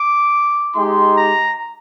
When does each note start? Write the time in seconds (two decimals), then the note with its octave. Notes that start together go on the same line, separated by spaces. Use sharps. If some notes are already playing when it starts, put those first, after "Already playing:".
Already playing: D6
0.75 G#3 D#4 G4 C6
1.16 A#5